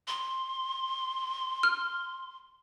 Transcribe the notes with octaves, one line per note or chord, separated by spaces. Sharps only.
C6
F6